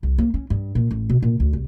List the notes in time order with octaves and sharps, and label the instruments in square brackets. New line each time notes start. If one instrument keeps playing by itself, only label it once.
[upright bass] C2
A#3
C#4
G2
A#2
A1
B2
A#2
D2
C2